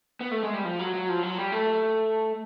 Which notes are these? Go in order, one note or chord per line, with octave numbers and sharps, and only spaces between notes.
B3
A3
G#3
G3
F3
F#3
F#3
F3
F#3
G3
A3